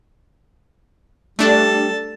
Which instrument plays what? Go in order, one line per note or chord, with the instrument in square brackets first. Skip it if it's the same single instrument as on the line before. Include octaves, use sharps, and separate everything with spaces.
[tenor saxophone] G3 [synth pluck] A3 D4 [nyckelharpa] A4 A5